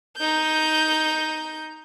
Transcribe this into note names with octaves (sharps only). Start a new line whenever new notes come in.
D#4 G6